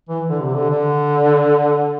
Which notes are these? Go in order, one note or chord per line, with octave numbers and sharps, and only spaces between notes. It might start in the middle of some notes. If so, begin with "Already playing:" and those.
E3
D3
C3
D3
D3